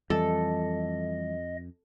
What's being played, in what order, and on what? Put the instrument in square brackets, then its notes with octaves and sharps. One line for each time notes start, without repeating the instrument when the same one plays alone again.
[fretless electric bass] F2 [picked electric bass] E3 G3 [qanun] A4 [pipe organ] D#5